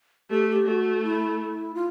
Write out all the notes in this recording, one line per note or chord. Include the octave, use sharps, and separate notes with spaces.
A3 G4
G4
A3 F#4
E4
F4